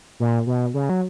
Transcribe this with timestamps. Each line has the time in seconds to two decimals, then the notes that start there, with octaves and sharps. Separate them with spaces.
0.20 A#2
0.47 B2
0.74 C#3
0.89 F#3